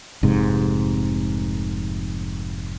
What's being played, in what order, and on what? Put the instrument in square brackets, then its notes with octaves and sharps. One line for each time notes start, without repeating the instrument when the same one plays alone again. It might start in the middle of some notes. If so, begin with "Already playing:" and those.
[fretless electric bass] F1 G#2 C3